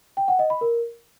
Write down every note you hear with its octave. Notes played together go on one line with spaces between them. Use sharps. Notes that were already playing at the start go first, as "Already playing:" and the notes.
G5
F#5
D#5
B5
A#4